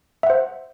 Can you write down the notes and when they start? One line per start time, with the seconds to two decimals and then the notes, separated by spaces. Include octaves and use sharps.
0.23 E5
0.27 F#5
0.30 C5